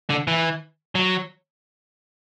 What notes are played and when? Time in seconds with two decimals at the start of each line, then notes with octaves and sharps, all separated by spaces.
0.10 D3
0.28 E3
0.95 F#3